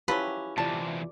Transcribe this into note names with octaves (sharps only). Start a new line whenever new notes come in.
F3 F#3 C#4 E4 G4 B4
E2 C3 F4 D5 A5